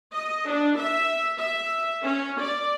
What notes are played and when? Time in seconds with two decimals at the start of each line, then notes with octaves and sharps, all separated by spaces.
0.13 D#5
0.47 D4
0.78 E5
1.38 E5
2.03 C#4
2.41 D5